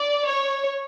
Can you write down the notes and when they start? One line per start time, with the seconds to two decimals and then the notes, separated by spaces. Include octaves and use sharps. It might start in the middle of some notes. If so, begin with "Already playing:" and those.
Already playing: D5
0.27 C#5